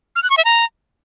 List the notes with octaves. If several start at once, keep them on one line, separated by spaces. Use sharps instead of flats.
F6
F#6
C#6
E5
A#5